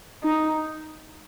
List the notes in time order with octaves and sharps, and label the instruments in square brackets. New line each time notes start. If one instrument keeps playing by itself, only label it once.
[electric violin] D#4